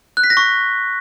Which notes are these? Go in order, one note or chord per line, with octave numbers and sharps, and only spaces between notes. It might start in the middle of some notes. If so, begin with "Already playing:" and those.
F#6
B6
A#6
C#6